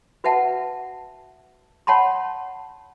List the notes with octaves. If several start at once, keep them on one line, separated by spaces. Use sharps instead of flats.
F#4 B4 E5 F#5 A5
C#5 F#5 A5 B5 C6